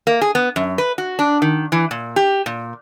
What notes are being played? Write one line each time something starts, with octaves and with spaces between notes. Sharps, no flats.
A#3
G#4
B3
F#2
B4
F#4
D4
D#3
E3
A#2
G4
A#2